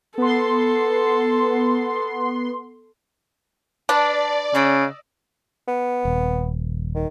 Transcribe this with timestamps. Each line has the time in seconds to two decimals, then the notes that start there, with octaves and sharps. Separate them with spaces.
0.18 B3 A4 C6
3.89 D4 B4 D5 A5 F6
4.55 C#3 D#5 D#6 E6
5.68 B3
6.05 D#1
6.95 D#3